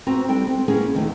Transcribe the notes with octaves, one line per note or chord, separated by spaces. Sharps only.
C4 F#4 B4 C5 A#5
G3 C4 D4 A4 G5
C4
A#3 B3 C#4 E4 G#4
E2 D#3 F3 A3